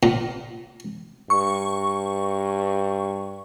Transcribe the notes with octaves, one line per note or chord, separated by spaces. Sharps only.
A#2
G2 C#6